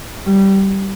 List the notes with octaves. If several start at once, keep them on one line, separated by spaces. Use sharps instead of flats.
G3